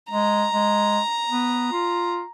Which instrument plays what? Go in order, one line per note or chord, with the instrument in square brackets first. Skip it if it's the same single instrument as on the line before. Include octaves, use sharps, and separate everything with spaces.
[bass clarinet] G#3 [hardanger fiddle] A#5
[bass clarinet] G#3
B3
F4